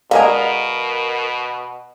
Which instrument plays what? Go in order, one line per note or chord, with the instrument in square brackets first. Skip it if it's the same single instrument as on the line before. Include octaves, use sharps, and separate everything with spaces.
[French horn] B2 [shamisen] D3 G#3 G#4 [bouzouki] A#4 [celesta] F5